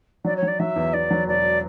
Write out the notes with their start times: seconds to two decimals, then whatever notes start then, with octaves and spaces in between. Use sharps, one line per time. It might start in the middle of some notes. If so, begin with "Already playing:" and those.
0.25 F#3 D5
0.36 C#5
0.43 F#3 D5
0.59 F#3 E5
0.76 E2
0.93 E2 D5
1.11 F#3
1.27 E1 D5